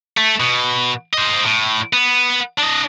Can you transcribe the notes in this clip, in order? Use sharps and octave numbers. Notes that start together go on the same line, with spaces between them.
A3
B2
C5 D#5
A2
B3
D4 D#5